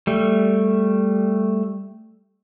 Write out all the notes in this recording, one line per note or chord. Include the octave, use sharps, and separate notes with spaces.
G3 A3